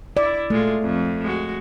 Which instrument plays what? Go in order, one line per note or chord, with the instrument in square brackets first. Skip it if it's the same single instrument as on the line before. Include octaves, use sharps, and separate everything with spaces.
[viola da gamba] E4 [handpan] D5
[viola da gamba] A#2 G#3 F4 [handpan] A3
[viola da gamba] F2
G#3 F#4